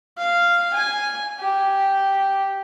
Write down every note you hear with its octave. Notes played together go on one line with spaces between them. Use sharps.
F5
G#5
G4